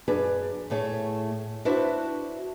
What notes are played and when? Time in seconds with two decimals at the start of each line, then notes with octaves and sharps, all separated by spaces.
0.08 F#2 D4 G#4 B4
0.70 A2 A3 G#4 C#5
1.65 D4 E4 F#4 B4 C5 E5